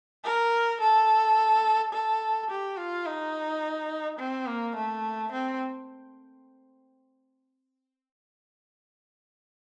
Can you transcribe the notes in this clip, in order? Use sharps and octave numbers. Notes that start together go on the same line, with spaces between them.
A#4
A4
A4
G4
F4
D#4
C4
A#3
A3
C4